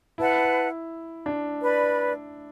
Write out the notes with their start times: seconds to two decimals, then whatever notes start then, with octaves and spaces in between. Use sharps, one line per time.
0.18 E4 B4 F#5 A5
1.26 D4
1.62 B4 D5 B5